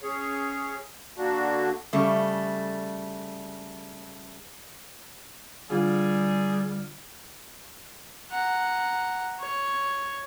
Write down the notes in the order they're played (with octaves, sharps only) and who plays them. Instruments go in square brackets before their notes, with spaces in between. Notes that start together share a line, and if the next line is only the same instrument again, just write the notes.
[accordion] C#4 G#4 C#5
D3 A#3 D4 F#4
[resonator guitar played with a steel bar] C#3 G3 A3
[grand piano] D3 E3 F4 [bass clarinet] G3 [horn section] G#4
[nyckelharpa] F#5 A#5
C#5